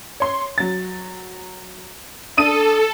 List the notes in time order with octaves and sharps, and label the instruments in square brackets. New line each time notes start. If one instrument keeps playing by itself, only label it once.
[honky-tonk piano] C#5 C6
F#3 A6
[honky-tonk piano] D4 D#6 D#7 [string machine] A4